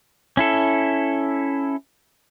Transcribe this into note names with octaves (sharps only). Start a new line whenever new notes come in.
C#4 E4 A4